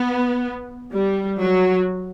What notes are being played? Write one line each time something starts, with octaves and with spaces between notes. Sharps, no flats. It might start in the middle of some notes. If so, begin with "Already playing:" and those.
Already playing: B3
G3
F#3